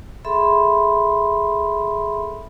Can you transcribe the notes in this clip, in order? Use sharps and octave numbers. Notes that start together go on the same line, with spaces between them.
G#4 A4 E5 B5 C6